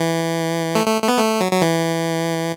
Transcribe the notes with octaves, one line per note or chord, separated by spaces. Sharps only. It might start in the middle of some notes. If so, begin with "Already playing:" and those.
Already playing: E3
A3
A3
A3
B3
A3
F#3
F#3
E3